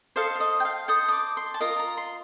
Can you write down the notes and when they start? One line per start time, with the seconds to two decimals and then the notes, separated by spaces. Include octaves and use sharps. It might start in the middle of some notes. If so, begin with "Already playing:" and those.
0.16 A4 C5 D#5 F5
0.35 F5
0.40 D#5
0.60 G5
0.65 F5
0.88 A4 C5 D#5 D#6
1.08 D#6
1.12 D6
1.37 C6
1.54 A5
1.61 F4 A#4 D#5 A#5
1.79 A#5
1.97 C6